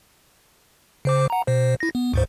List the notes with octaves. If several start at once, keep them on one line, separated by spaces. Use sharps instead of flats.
C#3 C5 D6
F#5 A#5
B2 C5
E4 A#6
B3
D2 G#2 C5